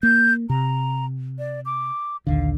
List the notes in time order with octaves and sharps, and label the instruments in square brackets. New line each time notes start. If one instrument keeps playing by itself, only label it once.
[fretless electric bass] A#3 [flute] G6
[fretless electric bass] C3 [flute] A#5
[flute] D5
D6
[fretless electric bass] A#1 D#2 D3 [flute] F5